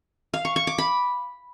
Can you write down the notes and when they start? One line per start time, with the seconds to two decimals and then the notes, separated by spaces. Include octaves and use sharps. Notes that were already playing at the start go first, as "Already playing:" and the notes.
0.34 F5
0.45 C#6
0.56 C#6
0.67 D6
0.78 B5